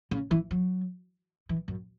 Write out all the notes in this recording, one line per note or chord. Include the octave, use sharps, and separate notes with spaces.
C#3
E3
F#3
E3
F#2